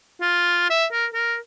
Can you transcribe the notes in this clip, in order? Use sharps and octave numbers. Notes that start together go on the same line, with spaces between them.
F4
E5
A#4
A#4